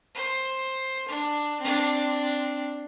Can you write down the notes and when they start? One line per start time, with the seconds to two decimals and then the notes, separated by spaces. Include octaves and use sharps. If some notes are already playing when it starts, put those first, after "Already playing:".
0.15 C5
1.09 D4
1.60 C4 D4